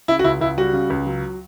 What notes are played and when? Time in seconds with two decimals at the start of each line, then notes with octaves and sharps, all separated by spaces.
0.08 C#3 E4
0.19 F#4
0.24 C#2 E4
0.41 C#2 E4
0.58 G3 F#4
0.73 C#3
0.90 C#2
1.07 F#3